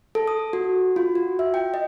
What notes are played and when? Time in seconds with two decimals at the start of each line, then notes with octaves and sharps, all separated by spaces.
0.15 A4
0.28 D#6
0.53 F#4
0.96 F4
1.15 F#4
1.39 E5
1.54 G5
1.74 D#5